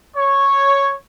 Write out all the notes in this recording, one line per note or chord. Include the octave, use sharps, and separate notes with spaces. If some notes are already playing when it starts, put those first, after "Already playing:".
C#5